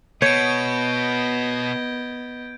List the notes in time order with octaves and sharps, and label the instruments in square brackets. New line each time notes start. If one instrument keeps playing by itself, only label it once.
[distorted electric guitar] B2 [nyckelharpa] B3 D#5 [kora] C#5 [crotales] G6 G#6 D7